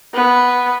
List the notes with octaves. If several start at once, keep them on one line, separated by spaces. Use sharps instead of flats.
B3